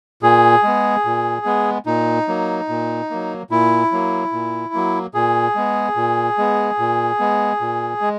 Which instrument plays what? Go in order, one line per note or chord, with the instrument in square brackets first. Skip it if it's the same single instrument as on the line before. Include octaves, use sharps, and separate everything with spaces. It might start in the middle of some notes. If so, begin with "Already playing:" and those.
[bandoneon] A#2 G#4
G#3 B3
A#2
G#3 B3
A#2 D#4
F#3 A#3
A#2
F#3 A#3
A#2 E4
F#3 A#3
A#2
F#3 A#3
A#2 G#4
G#3 B3
A#2
G#3 B3
A#2
G#3 B3
A#2
G#3